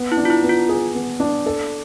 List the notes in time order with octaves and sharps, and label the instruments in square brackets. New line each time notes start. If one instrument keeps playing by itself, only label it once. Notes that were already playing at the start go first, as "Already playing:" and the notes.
Already playing: [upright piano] B3
[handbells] E4
[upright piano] D4
[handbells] F4
E4
[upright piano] B3
[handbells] F4
[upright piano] G#4
B3
D4
A4